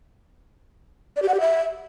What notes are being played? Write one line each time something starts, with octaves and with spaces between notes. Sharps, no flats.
D5
G4
F#5
G4
E5